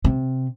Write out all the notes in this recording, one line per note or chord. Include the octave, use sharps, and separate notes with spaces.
C3